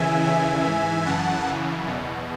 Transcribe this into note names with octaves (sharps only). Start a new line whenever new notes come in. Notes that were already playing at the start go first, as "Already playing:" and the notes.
Already playing: D#2 C#3 E3 E5 G#5
D#2 C#3 E3 E5 G#5
G#2 E3
F#2 C#3 E3 F#5 A5
F#2 C#3 E3
E2 B2